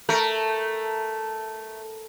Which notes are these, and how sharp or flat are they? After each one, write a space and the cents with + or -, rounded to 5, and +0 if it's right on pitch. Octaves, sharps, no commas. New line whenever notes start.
A3 +0 A#4 +0